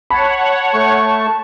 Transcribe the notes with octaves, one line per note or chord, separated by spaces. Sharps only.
C#5 F#5 A5 B5
A3 C#6